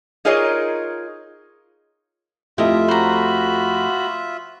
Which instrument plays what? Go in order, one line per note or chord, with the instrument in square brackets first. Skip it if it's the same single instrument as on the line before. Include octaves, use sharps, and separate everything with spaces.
[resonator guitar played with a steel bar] D#4 F4 G#4 A#4 C#5 D#5
[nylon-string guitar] F2 A3 G4 [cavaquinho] E4 D#5 [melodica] F4 E5
[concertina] F#4 B5 [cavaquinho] C5 A#5